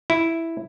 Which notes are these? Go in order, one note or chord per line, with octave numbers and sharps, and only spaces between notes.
E4